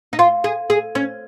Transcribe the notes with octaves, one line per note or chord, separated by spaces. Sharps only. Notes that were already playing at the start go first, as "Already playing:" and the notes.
D#4
F4
G#4
G#4
C#4